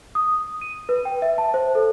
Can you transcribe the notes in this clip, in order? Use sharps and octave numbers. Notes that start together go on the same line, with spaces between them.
D#6
D#7
B4
G5
E5
A5
C5
A4